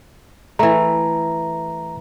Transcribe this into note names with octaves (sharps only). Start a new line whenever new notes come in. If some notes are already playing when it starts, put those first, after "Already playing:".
E3 A3 A#5